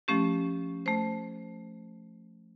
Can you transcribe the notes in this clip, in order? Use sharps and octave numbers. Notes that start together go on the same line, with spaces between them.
F3 A3 C#4 G4
A3 C5